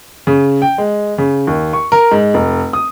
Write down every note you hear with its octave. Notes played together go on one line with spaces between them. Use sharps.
C#3
G5
G#3
C#3
D#2
C#6
A#4
G#2
F1
D#6